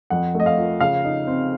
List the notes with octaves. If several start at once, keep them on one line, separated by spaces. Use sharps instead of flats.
F2 F#5
A3 D#5
F5
F3
C#3 F5
D#4
C4